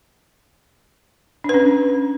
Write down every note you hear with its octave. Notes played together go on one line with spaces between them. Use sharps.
C#4 D4 B4